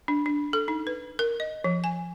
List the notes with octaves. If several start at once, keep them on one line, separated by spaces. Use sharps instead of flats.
D4
D4
A4
D#4
B4
A#4
D#5
F3
G#5